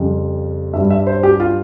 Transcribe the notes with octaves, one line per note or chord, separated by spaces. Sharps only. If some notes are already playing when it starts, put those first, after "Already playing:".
Already playing: F2 C#3 G3
G2 G3 E5
E5
C5
G4
F4